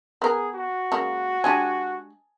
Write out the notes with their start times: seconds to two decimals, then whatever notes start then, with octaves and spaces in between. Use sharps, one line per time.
0.22 B3 G#4 A#4
0.55 F#4
0.92 C#3 G#3 A#3
1.44 G#3 D4 G4 G#5 A5